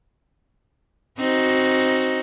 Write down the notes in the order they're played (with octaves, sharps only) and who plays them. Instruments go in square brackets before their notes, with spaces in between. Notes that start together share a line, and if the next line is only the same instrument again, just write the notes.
[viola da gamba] C4 D#4 F#4